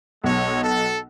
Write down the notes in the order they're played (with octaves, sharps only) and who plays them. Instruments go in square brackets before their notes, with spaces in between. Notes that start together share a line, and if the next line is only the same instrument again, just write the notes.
[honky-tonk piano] B1 [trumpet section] G#3 A4 C#5
[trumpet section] A4